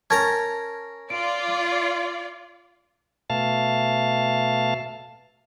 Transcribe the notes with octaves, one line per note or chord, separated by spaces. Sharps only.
C#4 A#4 A5 A#5 G#6 A6
F4 D5 D7
B2 A3 F5 A5